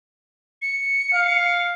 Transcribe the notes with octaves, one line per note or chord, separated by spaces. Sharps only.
C#7
F5